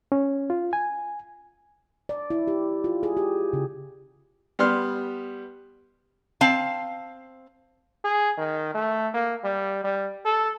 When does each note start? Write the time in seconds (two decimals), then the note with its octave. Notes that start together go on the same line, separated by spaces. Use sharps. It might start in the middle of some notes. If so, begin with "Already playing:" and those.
0.12 C#4
0.50 F4
0.73 G#5
2.09 D5
2.30 E4
2.48 G4
2.84 F4
3.03 G#4
3.17 G4
3.53 C#3
4.59 G3 B3 C6 F6
6.41 C4 F5 A5
8.04 G#4
8.38 D#3
8.75 A3
9.14 A#3
9.44 G3
9.84 G3
10.25 A4